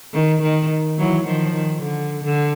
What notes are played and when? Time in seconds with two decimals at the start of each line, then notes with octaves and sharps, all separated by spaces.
0.14 D#3
0.42 D#3
0.98 E3 F#3
1.26 D#3 F3
1.54 D#3
1.82 D3
2.24 D3